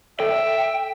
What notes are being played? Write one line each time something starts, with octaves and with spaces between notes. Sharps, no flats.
A4 E5 G5